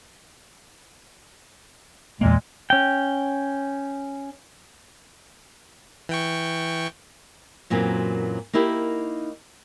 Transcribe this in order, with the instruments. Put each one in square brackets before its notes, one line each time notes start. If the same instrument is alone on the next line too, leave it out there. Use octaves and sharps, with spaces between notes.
[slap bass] E2 A#3 [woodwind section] A#2 G#3
[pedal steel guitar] C#4 G5
[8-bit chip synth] E3 G5 C#6
[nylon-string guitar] F#2 A#2 E3 F#3 A#3 C4
A#3 D#4 E4 G4 A#4